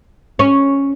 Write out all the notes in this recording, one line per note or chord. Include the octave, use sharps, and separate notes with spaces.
C#4